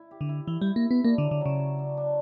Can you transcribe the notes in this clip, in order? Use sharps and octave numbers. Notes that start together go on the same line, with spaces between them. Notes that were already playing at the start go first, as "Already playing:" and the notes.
Already playing: E4
G4
D3
E4
E3 E4
G3 E4
A#3
B3 E4
A#3 D4
D3
F#3
D3
C#3 F#3
F#3
D4
D4